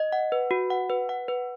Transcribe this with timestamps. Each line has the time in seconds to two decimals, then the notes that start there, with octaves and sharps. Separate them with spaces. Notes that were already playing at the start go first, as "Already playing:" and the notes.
Already playing: D#5
0.13 F#5
0.32 B4
0.51 F#4
0.70 F#5
0.90 B4
1.09 F#5
1.28 B4